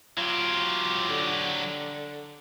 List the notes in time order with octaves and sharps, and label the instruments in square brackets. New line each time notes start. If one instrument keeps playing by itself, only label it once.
[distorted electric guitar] F#3 G4 [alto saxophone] F4
[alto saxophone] D3